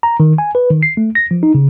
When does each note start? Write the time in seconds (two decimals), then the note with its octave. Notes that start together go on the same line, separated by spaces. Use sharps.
0.03 A#5
0.20 D#3
0.38 G#5
0.55 B4
0.70 D#3
0.83 C7
0.97 A3
1.15 A#6
1.31 F3
1.43 D#4
1.54 C#3